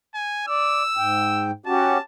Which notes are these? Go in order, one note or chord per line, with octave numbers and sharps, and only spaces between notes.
G#5
D5 E6
G#2 G5
C#4 F#4 G4 A5